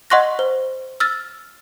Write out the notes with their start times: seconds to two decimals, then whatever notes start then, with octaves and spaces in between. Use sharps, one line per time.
0.10 D#5 F#5 C6 C#6 F#6 A#6
0.39 C5
1.00 E6 F6 A6